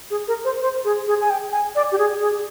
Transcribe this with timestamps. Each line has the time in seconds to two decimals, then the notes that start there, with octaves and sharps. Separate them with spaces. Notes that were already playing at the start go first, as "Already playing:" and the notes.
0.10 G#4
0.28 A#4
0.45 C5
0.62 C5
0.85 G#4
1.07 G#4
1.21 G#5
1.30 G5
1.52 G#5
1.75 D5
1.92 G4
1.98 G#4
2.21 G#4